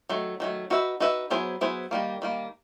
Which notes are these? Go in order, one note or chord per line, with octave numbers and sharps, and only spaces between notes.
D#3 F#3 A3
D#3 F#3 A3
D#4 F#4 B4 E5
D#4 F#4 B4 E5
F#3 B3 E4 G#4 C5
F#3 B3 E4 G#4 C5
D#3 G3 A#3
D#3 G3 A#3